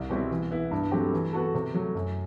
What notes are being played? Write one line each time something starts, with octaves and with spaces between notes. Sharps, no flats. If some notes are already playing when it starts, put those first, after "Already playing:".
Already playing: C2
B2 G3 C4 E4
E3
B3 E4
G2
F#3 A3 C4 G4
E3
B3 F#4 A4
C3
F#3 A3
F#2